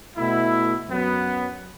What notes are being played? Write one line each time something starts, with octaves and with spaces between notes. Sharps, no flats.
B2 A3 E4
F#2 F#3 B3